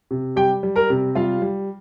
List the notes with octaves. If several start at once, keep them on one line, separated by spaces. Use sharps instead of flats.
C3
G3 G4 G5
G3
A#4 A#5
C3
G3 F4 F5
G3